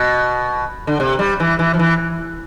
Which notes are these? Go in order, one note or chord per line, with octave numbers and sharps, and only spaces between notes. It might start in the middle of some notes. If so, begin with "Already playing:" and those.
Already playing: B2
D3
C3
G3
E3
E3
F3
E3